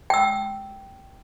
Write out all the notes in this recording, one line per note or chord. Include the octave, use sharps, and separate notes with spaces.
G5 E6